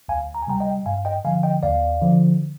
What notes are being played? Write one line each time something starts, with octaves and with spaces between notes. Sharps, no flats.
D2 F5 G#5
A#5
G#5
C3 G3 G5 A#5
D#5 G5
G2 F5 G#5
D#5 G5
D3 F3 F5 G#5
D#5 G5
D#2 D5 F5
D3 F3